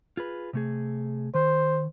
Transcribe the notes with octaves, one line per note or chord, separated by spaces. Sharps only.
F4 G#4 B4
C3 A3 G#4
D#3 C5